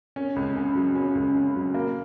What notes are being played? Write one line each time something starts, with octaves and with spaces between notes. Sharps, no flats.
C#4
C#2
C#3
F#3
C#4
C#2
C#3
F#3
A#3